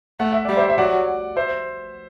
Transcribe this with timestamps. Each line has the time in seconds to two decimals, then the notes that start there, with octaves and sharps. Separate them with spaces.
0.20 A3 F#5
0.32 E5
0.45 G3 D5
0.57 C5 E5
0.70 E5
0.78 F#3 D5 F#5
1.36 C5 E5